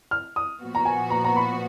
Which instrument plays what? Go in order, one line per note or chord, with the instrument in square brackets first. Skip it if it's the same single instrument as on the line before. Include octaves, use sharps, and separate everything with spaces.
[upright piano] F6
D#6
[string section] A#2 F3 B3 F#4
[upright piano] A#5
G#5
A#5
A#5
B5